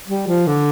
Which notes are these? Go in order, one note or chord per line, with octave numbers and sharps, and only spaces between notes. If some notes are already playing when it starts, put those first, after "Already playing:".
G3
F3
D3